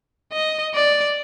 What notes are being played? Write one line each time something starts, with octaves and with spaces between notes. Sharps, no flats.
D#5
D5